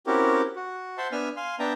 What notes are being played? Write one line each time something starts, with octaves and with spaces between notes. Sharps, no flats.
C4 C#4 E4 F#4 G4 A#4
F#4
C5 E5 F#5 A5 C6
B3 D4 E5 G#5 F6
F5 G#5 C6
B3 D4 E5 G5 A5 A#5